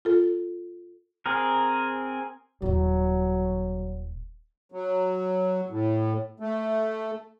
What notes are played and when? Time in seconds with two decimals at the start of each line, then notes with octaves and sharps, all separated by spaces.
0.05 F4 A4
1.26 C4 G#4 A#4
2.62 D#1 F#3 E4
4.72 F#3
5.70 A2
6.40 A3